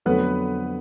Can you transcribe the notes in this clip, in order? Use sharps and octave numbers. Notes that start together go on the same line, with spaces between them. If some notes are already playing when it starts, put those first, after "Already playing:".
F2 D3 F#3 A3 B3 B4